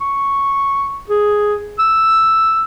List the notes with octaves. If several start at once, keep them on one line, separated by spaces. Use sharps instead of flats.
C#6
G#4
E6